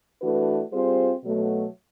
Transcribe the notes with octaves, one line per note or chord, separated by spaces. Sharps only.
E3 A3 D4 F#4 B4
G3 C4 F4 G#4 C5
B2 F#3 A3